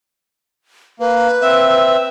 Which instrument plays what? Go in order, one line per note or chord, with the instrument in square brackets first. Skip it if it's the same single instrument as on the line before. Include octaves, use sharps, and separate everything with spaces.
[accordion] A#3 [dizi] B4
[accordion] C4 E5